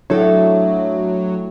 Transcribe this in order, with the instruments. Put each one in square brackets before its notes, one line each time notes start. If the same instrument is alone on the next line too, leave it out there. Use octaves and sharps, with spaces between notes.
[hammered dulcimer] A2 [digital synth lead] F#3 [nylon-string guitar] D4 E4 A4